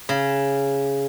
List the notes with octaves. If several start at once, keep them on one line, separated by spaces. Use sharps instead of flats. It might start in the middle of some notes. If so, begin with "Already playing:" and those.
C#3